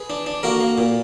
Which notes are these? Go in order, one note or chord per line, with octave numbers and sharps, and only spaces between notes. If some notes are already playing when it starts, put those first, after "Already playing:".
Already playing: G#4 B4
D4
D4
A#3 F#4 A#4
A#3
A#2